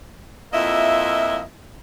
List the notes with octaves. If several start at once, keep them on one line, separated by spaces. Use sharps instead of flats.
F2 A#3 E4 F4 D#5 E5